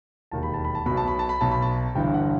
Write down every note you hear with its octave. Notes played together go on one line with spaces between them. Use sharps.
E1 D#2 D#3 A5
B5
A5
B5
A5
B1 B2 B5
A5
B5
A5
B5
B1 B2 A5
B5
A5
G1 G2 E3 G5
F#5